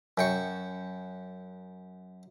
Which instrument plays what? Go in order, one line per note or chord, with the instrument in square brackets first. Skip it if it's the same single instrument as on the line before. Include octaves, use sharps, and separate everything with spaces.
[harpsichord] F#2 G5 C#6